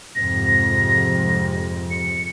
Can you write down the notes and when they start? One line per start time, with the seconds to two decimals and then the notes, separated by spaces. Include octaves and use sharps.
0.16 F2 G#2 C3 A#6
1.91 C#7